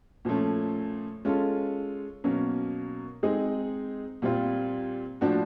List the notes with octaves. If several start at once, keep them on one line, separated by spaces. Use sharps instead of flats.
A#2 F3 A3 C#4
G#3 C#4 F4 A4
B2 F#3 A#3 C#4
G#3 C4 D#4 G#4
A#2 G3 C4 F4
A2 F3 A#3 D4 F#4